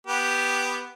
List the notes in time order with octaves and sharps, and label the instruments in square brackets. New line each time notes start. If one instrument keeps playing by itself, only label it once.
[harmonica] B3 G4